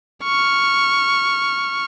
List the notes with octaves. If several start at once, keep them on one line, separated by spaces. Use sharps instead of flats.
C#6 F6